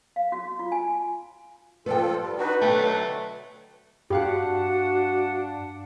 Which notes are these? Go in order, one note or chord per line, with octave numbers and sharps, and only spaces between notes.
F5
F#4
F4
G#5
F3 F4 A4 B4 D5 G5
G3
D4 D#4 F#4 B4
B2 D3 F#3 A3 G5
G2 D4 F#4 G4 F5 F#5 F#6